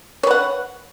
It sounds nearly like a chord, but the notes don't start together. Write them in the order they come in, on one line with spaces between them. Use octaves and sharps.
C#5 B4 F#5